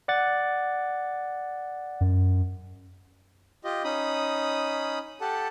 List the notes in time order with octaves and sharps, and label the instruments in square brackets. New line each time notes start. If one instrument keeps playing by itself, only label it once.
[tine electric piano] D5 F#5 A6
[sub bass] F#2
[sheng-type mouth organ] F4 G4 D#5
C#4 D#4 B5 D#6
G4 A4 F#5 A5